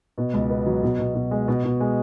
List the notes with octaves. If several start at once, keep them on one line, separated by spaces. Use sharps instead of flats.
B2
C#2
B3
F#3
B2
B2
B2
G#3
B2
B2
G#3